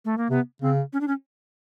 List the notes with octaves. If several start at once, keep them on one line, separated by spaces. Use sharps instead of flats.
A3
A#3
C3 B3
C#3 C4
C#4
D4
C#4